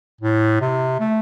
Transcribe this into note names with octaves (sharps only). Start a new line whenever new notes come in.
A2
C3
A3